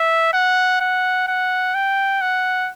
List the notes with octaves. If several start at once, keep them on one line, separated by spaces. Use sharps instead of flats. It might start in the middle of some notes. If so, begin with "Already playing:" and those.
Already playing: E5
F#5
F#5
F#5
G5
F#5